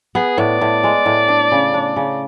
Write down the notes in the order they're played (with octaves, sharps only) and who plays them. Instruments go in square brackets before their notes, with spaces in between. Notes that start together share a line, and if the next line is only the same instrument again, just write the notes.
[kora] B3 [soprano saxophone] G#4
[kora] A2 [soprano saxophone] D5
[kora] A2
G#3
A2
D4
C#3
D4
C#3